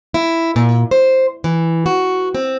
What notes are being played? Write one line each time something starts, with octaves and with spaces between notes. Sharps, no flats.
E4
A#2
C5
E3
F#4
C4